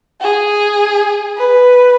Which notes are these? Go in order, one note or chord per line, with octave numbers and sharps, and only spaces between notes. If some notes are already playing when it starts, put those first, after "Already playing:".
G#4
B4